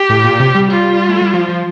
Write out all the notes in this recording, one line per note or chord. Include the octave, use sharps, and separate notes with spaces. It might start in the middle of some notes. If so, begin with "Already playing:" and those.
Already playing: G4
A2
A#2
C3
G3
F4
A3
G3
F3
F3